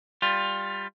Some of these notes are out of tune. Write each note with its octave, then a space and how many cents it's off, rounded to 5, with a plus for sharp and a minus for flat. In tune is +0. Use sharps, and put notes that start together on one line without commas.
G3 +15 F4 +10